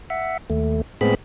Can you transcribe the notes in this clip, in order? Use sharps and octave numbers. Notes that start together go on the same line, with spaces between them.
E5 F#5
D#2 A3
A2 G#3 B3 C4 G#4 B5